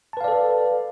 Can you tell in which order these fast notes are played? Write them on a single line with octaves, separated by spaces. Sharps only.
A5 B4 F5 D5 A4